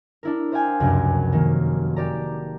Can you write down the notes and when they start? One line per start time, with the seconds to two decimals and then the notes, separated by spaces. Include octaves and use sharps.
0.23 D4 E4 A#4
0.52 C5 E5 F5 G5 G#5
0.80 F1 C#2 F#2 C3 F#6
1.32 D#3 A#3
1.96 G4 D5 A#5